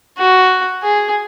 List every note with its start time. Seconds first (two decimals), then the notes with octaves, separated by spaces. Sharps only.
0.18 F#4
0.83 G#4